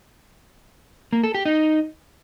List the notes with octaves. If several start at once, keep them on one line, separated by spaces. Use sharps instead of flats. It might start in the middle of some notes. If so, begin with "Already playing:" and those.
A#3
A4
G4
D#4